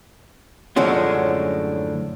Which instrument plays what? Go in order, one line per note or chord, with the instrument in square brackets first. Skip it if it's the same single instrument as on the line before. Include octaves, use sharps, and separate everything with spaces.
[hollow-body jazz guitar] F#2 A2 D3 F3 G#3 C#4